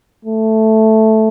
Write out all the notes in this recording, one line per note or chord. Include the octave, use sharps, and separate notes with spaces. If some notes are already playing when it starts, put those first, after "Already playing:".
A3